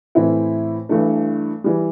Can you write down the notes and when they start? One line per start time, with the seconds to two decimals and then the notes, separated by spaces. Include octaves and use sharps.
0.15 A2 E3 C4 E4
0.89 G2 E3 A3
1.64 E3 G3